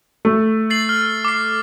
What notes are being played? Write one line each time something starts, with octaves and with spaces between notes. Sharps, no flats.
A3
A6 C7 F#7
F6
D6 C7